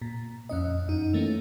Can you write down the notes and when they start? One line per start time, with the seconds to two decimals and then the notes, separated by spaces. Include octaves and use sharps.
0.01 A#2
0.49 F2 C#4 D#5
0.88 F#2 D#4
1.13 E3 A3 A#3 C#4